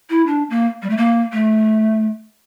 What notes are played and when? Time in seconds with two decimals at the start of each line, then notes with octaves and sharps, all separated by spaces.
0.10 E4
0.27 D4
0.50 A#3
0.82 G3
0.90 A3
0.97 A#3
1.33 A3